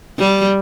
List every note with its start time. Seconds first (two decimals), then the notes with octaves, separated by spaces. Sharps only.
0.19 G3